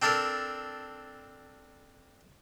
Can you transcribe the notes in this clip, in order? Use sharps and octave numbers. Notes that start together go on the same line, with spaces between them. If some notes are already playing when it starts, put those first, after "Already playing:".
C4 D4 A4 A#4